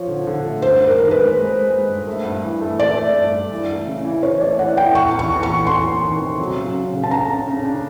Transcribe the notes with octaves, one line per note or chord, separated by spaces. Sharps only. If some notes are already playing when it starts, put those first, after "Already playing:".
Already playing: F3 C#5
D3
D3
A3
G2 C5
G2
A#4
D#3
B4
G#3
G#3
G#3
G#3
G2
A3
G2
E3
A3
A3 D5
A3
G2
G2
E3
A3
C#3
E3
E3 C#5
A3 D5
E3 F#5
E3 G5
E2 C#6
E2
C#6
E2
C#6
E2
E2 C6
E2
D#3
C3
F#3
C#3
C#3
C#3
A5
D4 A#5
C#3
C#3
D4